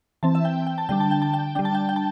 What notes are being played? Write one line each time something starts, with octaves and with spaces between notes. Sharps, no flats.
E3 C4 A5
E5
G5
G5
A5
D3 G3 D4 G5
A5
G5
A5
G5
G3 D4 G5
A5
G5
G5
A5